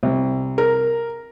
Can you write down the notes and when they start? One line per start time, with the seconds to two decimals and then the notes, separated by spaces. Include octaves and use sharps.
0.03 C2
0.58 A#4